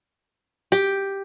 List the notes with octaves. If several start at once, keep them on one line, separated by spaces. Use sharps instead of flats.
G4